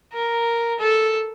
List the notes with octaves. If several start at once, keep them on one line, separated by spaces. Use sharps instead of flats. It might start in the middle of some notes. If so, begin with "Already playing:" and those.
A#4
A4